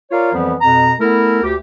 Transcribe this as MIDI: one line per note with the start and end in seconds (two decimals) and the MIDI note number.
0.11 0.32 65
0.11 0.32 70
0.11 0.32 73
0.11 0.32 74
0.11 0.32 77
0.32 0.54 41
0.32 0.54 52
0.32 0.54 53
0.32 0.54 55
0.32 0.54 59
0.61 0.92 41
0.61 0.92 47
0.61 0.92 82
0.99 1.42 57
0.99 1.42 59
0.99 1.42 64
0.99 1.42 69
0.99 1.42 70
1.42 1.54 38
1.42 1.54 67